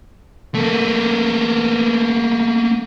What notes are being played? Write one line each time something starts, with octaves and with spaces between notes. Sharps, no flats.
A3 A#3